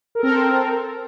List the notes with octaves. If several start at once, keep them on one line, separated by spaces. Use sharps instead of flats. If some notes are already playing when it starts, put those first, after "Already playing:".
C4 A4 A#4